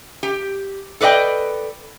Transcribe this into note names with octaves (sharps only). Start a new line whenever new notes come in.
G4
A4 B4 D5 D#5 G5